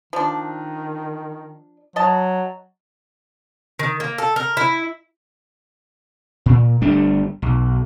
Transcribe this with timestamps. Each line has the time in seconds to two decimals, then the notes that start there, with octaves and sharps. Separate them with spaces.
0.13 D#3 F3 D4
1.96 F#3 D#5 A5
3.79 D#3
4.00 A#3
4.18 A4
4.36 A#4
4.57 E4
6.46 A#2
6.81 G1 G3 A3 D4
7.42 B1